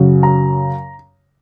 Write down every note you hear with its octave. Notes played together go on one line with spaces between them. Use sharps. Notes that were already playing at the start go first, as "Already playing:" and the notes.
Already playing: F#2 C#3 F#3
A#5